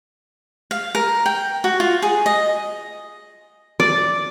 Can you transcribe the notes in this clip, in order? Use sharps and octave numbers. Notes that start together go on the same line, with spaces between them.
F5
A#4
G5
F#4
F4
G#4
D#5
D5